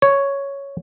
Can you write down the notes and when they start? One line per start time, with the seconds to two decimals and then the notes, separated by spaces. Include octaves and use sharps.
0.02 C#5